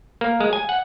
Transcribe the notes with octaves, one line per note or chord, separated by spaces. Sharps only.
A#3
G#3
G#5
F#5